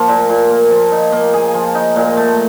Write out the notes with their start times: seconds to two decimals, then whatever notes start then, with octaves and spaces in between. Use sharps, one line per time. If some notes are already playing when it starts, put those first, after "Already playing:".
Already playing: F3 A#3
0.08 A#2
0.29 A#2
0.50 A#3
0.71 F3
0.92 D#4
1.12 A#3
1.33 G#4
1.54 F3
1.75 D#4
1.96 A#2
2.17 A3